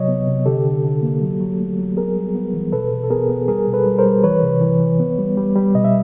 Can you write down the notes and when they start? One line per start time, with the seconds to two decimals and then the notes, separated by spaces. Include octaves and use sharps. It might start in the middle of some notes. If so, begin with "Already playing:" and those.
Already playing: C3 F#3 C#5 D#5
0.08 B3
0.27 C3
0.46 D3 G4 A4
0.65 D3
0.84 D3
1.03 A#3
1.22 F#3
1.41 F#3
1.59 A3
1.78 F#3
1.97 B3 G#4 A#4
2.16 G3
2.35 B3
2.54 E3
2.72 B2 A4 B4
2.91 B2
3.04 A4
3.10 B3 G#4 A#4
3.29 B3
3.48 G3 G#4 A#4
3.67 B2
3.73 A4 B4
3.86 G3
3.98 A#4 C5
4.05 G3
4.24 E3 B4 C#5
4.43 C3
4.61 E3
4.80 E3
4.99 B3
5.19 G3
5.37 G3
5.56 G3
5.75 B2 D#5
5.84 E5